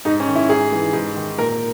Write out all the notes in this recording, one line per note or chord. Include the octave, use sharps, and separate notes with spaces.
G#2 D#4
C#4
D#3
E4
G#2 G#4
E3
G#2
D#3
A#2 A#4